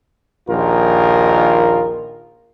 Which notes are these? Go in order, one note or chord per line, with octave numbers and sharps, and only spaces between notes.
A#1 D#2 D#3 F4 A#4